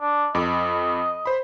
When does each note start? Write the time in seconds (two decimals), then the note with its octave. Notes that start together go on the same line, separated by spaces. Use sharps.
0.01 D4
0.35 F2 D#5 D6
1.26 C5 B5